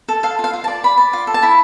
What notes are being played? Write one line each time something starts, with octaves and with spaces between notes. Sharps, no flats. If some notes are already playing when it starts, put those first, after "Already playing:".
A4
A4 F5
F4 F5
F4
A5
D5
D5 B5
D5
F4
A4
A5
E4 B5